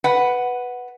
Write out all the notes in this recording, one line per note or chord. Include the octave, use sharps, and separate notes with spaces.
B4 F#5